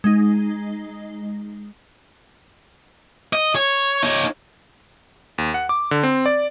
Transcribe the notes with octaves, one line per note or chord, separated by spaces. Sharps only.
G#3 D#4
D#5
C#5
D#4 C#5
D#2
F#5
D6
D3
C4
D5